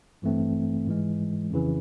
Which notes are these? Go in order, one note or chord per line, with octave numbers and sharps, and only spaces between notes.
A1 G2 E3 A3 C4
G#2 E3 G#3
F2 C#3 E3